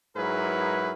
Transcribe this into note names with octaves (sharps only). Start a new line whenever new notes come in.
G#2 F#3 E4 G#4 A#4 B4